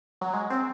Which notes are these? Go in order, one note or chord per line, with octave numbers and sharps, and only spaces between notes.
F#3
G#3
C4